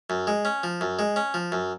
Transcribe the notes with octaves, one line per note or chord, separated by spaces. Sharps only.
F#2
G#3
C#4
F3
F#2
G#3
C#4
F3
F#2